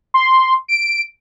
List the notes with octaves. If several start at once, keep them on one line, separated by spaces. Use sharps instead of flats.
C6
D7